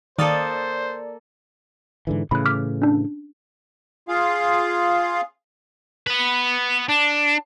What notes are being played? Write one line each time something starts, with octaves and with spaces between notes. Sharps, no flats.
D#3 A#3 A4 C5 D5 D#6 A6
G#2 D3 E3
A2 C#3 E3 B5 F#6
D6 F6 B6
C#4 D4
F4 G#4 F5
B3 B4
D4